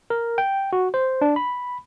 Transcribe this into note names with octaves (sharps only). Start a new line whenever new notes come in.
A#4
G5
F#4
C5
D4
B5